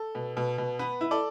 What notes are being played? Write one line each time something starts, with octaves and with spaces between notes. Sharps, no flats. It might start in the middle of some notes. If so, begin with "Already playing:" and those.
Already playing: A4
B2
B2
B2
B3 B4
E4
A4 D5